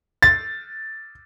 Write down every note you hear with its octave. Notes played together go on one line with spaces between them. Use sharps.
A6